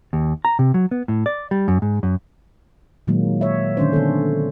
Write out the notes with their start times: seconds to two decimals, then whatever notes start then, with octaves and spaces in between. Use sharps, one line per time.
0.13 D#2
0.45 A#5
0.59 C3
0.74 F#3
0.91 B3
1.08 A2
1.26 D5
1.51 G3
1.68 F#2
1.82 G#2
2.03 F#2
3.07 A#2 D#3 F#3 G#3 A#3
3.41 C#5 E5
3.77 D3 D#3 C#4 D4 C5
3.93 D3 B3 A4